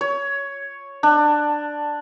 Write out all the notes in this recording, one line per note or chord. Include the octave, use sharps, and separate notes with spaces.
C#5
D4